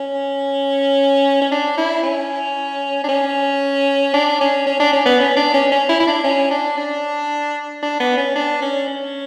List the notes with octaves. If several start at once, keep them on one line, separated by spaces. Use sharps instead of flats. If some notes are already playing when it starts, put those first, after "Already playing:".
Already playing: C#4
C#4
D4
E4
C#4
D4
C#4
D4
C#4
C#4
D4
C#4
B3
C#4
D4
C#4
C#4
E4
E4
D4
C#4
D4
D4
D4
B3
C#4
D4
C#4
C#4